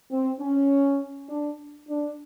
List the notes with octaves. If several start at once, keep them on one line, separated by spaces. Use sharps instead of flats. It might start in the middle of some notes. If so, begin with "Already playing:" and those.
C4
C#4
D4
D4